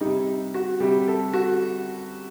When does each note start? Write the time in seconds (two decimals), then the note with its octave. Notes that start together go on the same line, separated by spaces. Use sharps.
0.01 G3 D#4
0.05 C3
0.54 F#4
0.80 C3 G3 G4
1.08 A4
1.33 F#4